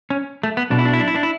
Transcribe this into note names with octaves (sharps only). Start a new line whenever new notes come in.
C#4
A3
B3
B1 B2 D4
E4
D4
E4
D4
E4
D4
E4